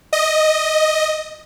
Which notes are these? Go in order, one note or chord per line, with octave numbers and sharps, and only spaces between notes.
D#5